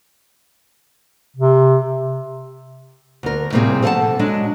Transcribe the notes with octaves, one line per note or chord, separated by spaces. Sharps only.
C3
D2 A#4
A2 C3 G3 A#3 C4 G#4
F3 A4 F5 F#5 A5
F#3 G#3 D4